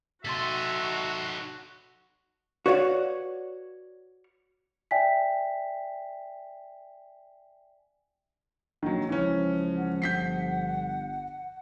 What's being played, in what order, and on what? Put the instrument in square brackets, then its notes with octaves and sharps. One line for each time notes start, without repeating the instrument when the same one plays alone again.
[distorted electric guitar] D#4 A4 [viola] F#4 [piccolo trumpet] E5 [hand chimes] C6 A6 B6
[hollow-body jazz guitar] F#4 B4 C#5 D5 F5 F#5
[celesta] D5 E5 G5 G#5 B6
[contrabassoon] A#1 [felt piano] D#3 F#3
[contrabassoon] C#2 [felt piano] E3 C#4 [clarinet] F3
[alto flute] F#5
[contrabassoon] G1 [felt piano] G6 B6 C7